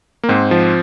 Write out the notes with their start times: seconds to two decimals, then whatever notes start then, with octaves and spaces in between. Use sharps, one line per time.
0.23 A#3
0.29 G#2 C4
0.51 F3